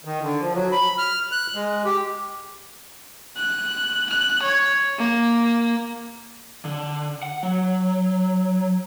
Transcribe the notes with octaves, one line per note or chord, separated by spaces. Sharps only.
D#3
D3
F3
F#3
B5
F6
F#6
G#3
G4
F#6
F#6
C#5
A#3
D3
F#5
F#3